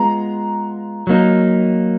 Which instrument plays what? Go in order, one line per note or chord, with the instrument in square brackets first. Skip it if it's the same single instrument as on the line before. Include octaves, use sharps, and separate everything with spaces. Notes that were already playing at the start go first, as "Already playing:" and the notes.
Already playing: [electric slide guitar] G#3 B3 F4 [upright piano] A#5
[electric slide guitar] F#3 A#3 D#4